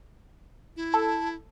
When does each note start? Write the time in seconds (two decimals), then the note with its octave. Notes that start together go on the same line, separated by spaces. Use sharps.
0.76 E4
0.94 A4 A5